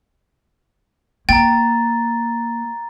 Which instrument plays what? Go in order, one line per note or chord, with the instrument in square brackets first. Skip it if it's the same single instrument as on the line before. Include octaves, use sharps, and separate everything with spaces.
[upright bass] A#3 [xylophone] G5 [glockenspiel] A#5 A6